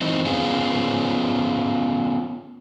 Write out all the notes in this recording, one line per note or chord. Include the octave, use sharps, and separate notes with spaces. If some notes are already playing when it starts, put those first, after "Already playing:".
E3 C4 D#4
B3 C#4 F4 G#4